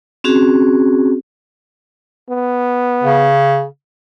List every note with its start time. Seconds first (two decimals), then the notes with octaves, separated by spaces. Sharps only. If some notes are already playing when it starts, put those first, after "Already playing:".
0.24 C4 C#4 F#4 G#4
2.29 B3
3.03 C#3